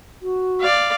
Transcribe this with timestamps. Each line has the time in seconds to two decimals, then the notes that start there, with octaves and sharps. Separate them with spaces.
0.22 F#4
0.61 D5 F5